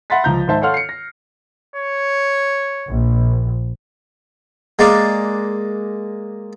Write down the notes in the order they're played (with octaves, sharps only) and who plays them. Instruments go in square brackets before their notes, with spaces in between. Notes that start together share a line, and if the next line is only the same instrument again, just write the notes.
[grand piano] E5 F#5 B5 C6 A6 B6
C#2 F3 A#5 G6
G#2 D#3 D#4 C5 E5 A5
A4 C#5 F5 F#5 C6 F6
C7 C#7
A#6
[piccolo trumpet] C#5
[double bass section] A#1
[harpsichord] G#3 A#3 D5